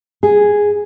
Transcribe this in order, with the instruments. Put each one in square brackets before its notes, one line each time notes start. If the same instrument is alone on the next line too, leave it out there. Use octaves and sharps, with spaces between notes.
[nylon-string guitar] G#4